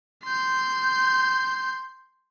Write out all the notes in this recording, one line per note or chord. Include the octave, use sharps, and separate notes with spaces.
C6 G6